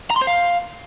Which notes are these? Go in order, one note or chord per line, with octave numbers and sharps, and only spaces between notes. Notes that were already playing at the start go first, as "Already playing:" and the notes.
A#5
C6
C5
F5